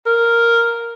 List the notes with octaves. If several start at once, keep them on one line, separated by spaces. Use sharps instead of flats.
A#4